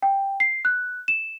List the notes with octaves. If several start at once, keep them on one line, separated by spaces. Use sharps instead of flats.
G5
C7
F#6
E7